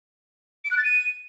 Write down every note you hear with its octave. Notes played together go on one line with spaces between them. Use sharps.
D7
F#6
A6
D#7